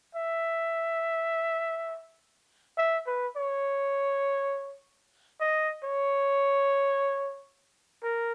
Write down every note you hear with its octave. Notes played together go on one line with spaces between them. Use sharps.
E5
E5
B4
C#5
D#5
C#5
A#4